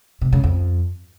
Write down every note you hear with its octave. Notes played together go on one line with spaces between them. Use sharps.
C3
C#3
F2